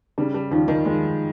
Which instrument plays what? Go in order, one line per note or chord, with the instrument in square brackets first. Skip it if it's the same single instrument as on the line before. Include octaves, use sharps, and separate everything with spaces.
[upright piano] C#3 [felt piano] G3
[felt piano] G3
[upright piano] D#2 [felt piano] F3
[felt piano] D#3
[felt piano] F3 [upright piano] G#3